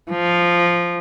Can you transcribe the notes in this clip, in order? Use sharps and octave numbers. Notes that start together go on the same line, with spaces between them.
F3